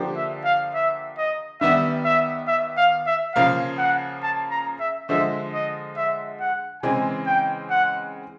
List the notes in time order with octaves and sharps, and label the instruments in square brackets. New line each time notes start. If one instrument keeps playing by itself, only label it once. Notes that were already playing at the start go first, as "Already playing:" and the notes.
Already playing: [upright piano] D3 F3 A#3 D4 G4
[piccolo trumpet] E5
F5
E5
D#5
[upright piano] D#3 G3 B3 [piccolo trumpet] E5
[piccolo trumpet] E5
E5
F5
E5
[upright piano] C#3 F3 A#3 [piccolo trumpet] F5
[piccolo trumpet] F#5
A5
A#5
E5
[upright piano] D3 F3 G#3 [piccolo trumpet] E5
[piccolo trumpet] D#5
E5
F#5
[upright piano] C#3 E3 G#3 C4 [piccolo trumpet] G#5
[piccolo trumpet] G5
F#5